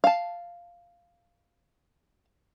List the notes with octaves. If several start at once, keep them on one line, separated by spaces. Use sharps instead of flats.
F5 A5